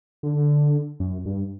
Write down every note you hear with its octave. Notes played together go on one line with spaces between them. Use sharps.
D3
F#2
G2